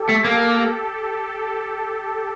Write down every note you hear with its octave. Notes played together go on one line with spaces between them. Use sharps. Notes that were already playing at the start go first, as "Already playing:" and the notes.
Already playing: G4 A4
A3
A#3
G4 A4